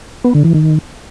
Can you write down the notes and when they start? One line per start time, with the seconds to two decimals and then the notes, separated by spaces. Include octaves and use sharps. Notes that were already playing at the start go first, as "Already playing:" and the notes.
0.24 B3
0.34 D3
0.44 E3
0.54 D#3